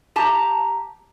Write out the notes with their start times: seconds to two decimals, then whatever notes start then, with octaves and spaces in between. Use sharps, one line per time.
0.16 G4 A5 A#5